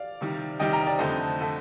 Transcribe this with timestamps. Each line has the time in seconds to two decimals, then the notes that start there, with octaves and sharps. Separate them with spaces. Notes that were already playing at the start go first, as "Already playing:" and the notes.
Already playing: D5 F5
0.21 C3 D#3 G3
0.60 C3 D#3 G3 D#5 G5
0.73 G5 A#5
0.86 D5
0.99 F2 D3 A3 C5 D#5
1.40 D3 A3